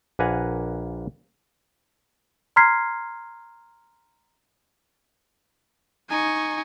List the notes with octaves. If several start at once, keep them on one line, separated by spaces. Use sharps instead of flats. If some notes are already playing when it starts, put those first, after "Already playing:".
A#1 A#3 B4 F#5 G#5 A#5
A#5 C6 F6 G#6 B6 C7
D#4 G#5 C#6